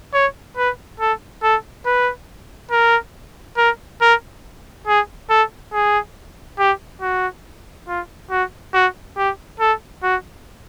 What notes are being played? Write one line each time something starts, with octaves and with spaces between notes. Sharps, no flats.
C#5
B4
A4
A4
B4
A#4
A#4
A#4
G#4
A4
G#4
G4
F#4
F4
F#4
F#4
G4
A4
F#4